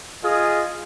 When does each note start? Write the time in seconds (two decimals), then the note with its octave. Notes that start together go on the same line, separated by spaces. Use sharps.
0.24 F4 G#4 D#5